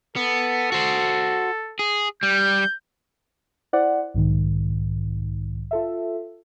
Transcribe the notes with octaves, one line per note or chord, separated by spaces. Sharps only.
B3 A4
F#4 C5
G#4
G3 G6
E4 C5 D5 F#5
B1 G#2 D#3
F4 A4 E5